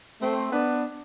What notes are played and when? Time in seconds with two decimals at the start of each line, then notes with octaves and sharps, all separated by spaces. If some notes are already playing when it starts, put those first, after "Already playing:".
0.20 A3 C4
0.51 B3 D4